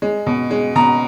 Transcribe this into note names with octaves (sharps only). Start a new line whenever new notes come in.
G#3
B2
G#3
B2 A#5